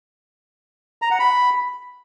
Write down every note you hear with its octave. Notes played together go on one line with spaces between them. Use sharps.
A#5
F#5
B5